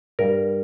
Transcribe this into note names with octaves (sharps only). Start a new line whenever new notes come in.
G2 G3 A#4